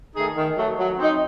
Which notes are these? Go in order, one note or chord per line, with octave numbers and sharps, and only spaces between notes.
D#3 A3 D#4 G#4
D#3
F#3 A3
F#3
C4 D#4